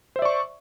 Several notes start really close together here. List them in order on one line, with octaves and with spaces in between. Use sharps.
C5 E5 D5 C#6